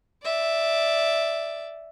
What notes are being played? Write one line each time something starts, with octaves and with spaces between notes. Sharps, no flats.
D5 E5